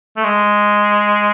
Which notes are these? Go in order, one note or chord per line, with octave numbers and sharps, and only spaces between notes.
A3
G#3